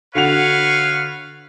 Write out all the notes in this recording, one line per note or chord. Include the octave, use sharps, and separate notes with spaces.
D3 F#4 B4 C#5 F5 F7